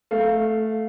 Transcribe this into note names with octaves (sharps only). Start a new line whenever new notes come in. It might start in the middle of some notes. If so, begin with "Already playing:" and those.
A3 F5